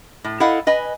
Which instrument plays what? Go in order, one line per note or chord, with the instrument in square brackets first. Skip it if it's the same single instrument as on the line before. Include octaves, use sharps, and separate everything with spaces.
[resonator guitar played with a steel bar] A2
E4 A4 D#5 F5 F#5
B4 D#5 G#5